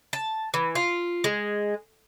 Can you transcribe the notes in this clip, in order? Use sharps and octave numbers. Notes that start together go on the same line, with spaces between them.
A5
E3
F4
G#3